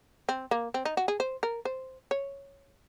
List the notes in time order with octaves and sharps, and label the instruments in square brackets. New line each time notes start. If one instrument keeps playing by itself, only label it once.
[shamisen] C4
A#3
C4
D#4
F#4
G#4
C5
A#4
C5
C#5